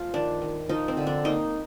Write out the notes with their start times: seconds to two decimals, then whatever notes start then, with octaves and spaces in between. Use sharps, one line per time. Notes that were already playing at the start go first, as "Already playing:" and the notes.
Already playing: F3 A3 F4
0.14 D#3 D4
0.42 D#3
0.69 F3 D#4
0.88 C4
0.97 D3
1.07 D4
1.25 A#3 D#4